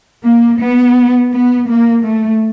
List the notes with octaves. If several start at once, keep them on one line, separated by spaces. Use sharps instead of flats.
A#3
B3
B3
A#3
A3